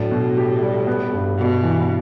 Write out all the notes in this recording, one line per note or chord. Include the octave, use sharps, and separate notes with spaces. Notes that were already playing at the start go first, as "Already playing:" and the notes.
Already playing: A2 F#3 D4
B2
G4
G3
B3
G2
B2 F#4
E3